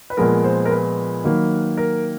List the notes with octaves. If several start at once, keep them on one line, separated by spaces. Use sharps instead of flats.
B4
A#2 F3 G#3 B3 A#4
C5
A#4
B4
D#3 F#3 A#3
A#4